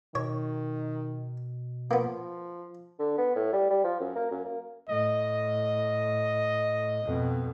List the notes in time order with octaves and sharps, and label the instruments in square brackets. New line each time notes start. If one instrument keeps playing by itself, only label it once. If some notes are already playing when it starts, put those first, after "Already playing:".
[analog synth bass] B2 [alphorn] D#3 [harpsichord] C#5
[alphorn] F3 [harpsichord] A#3 B3
[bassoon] D3
B3
A2
G3
G3
F3
F#2
A#3
F#2
A#3
[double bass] A2 [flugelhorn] D#5
[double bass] F2 B2